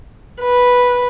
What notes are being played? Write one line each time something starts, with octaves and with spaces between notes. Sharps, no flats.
B4